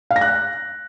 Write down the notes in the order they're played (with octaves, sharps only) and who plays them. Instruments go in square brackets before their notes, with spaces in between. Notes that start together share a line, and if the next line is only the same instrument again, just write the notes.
[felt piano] F5
A#6
F#6